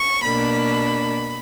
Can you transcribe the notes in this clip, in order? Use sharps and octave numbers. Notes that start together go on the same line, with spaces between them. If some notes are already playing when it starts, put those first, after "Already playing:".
Already playing: C#6
B2 A#3 D4 B5